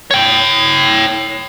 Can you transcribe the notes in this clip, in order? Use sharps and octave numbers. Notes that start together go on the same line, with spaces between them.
C#5 G5